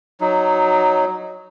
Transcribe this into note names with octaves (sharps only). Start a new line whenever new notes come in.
F#3 D#4